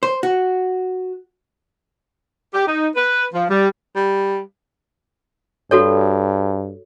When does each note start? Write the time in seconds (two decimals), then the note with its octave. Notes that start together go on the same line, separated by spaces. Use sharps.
0.03 C5
0.23 F#4
2.53 G4
2.67 D#4
2.95 B4
3.33 F3
3.48 G3
3.96 G3
5.71 G2 F#4 A4 C#5